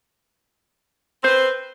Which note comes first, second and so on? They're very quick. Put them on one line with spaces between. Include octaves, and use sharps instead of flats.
C4 C5 B4